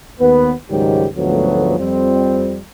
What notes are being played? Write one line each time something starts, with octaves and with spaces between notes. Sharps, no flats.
D#2 B3 B4
C#2 G#2 D#3 F#3 G3 G4
D2 G#2 F3 F#3 A3 B3
F2 G3 C4